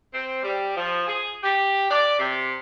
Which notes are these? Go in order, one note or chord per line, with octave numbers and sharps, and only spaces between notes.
C4
G3
F3
G#4
G4
D5
C3